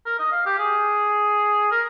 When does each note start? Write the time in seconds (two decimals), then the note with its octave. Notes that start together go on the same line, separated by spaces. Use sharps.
0.06 A#4
0.19 D#5
0.32 F5
0.46 G4
0.59 G#4
1.71 A#4